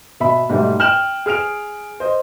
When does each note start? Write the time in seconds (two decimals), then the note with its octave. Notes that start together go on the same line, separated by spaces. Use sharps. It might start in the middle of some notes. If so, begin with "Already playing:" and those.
0.20 B2 E5 B5
0.49 G#2 B2 G3 A3
0.79 G5 F6 G6 E7 F#7
1.26 G#4 F6 D7 F7
2.00 C5 D#5